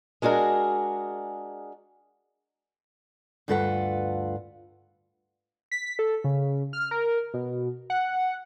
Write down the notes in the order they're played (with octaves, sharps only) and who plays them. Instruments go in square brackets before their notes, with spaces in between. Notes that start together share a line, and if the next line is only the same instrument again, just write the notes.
[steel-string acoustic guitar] G#3 D4 F#4 G#4 A#4
D2 G2 F4 A4 B4 F#5
[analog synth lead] B6
A4
C#3
F6
A#4
B2
F#5